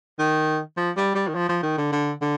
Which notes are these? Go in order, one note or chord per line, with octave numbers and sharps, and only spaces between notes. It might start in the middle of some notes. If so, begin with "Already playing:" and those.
D#3
F3
G3
G3
D#3
F3
F3
D#3
D3
D3
D3